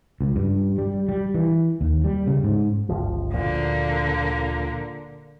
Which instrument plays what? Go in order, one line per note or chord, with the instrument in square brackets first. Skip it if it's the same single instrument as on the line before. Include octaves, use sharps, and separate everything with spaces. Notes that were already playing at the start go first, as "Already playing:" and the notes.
[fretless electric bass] C#2
G2
G3
G3
E3
D#2
G3
C#3
G#2
[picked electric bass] G1 C#2 F3
[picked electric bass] D2 A#2 F3 [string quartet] D3 A#3